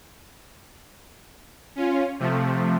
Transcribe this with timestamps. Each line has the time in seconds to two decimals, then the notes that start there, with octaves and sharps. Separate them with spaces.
1.76 C#4 F4
2.19 C3 F3 A3